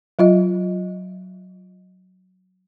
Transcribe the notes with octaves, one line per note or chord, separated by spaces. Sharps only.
F#3 F4 D#5